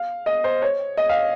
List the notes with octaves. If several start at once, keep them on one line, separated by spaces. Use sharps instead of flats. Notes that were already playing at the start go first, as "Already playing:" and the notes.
Already playing: F5
D#5
C5
C#5
D#5
F5